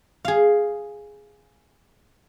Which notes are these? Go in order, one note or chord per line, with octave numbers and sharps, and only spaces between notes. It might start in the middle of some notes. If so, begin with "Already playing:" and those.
G#4 F5